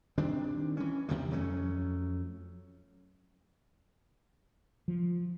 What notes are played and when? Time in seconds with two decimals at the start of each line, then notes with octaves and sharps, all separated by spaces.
0.18 D#3 G3 C4 D4
0.77 E3 C#4
1.09 D#2 C3 D#3 G3
1.31 F2 F#3 A3 C#4
4.88 F3